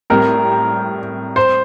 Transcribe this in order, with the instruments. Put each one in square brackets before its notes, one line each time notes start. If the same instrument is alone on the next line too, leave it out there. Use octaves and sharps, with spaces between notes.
[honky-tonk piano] A2 G3 C4 [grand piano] A#4
[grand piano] C5